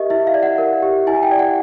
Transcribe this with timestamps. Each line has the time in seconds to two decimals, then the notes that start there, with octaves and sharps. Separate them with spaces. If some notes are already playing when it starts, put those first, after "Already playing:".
Already playing: G4 A#4 D#5 E5
0.10 E4 E5
0.27 F5
0.34 D5
0.43 F#5
0.58 A#4
0.83 G4
1.07 E4 G#5
1.23 G5
1.31 D5
1.39 F#5